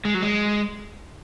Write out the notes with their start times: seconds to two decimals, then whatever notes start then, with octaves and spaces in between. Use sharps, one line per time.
0.05 G#3
0.14 F#3
0.23 G#3